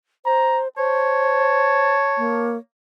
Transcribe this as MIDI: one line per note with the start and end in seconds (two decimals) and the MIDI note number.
0.26 0.68 72
0.26 0.61 82
0.77 1.95 72
0.77 2.58 73
0.77 2.50 81
2.18 2.57 58